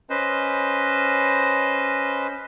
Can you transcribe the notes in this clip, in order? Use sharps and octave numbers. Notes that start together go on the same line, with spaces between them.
C#4 B4 C5 D#5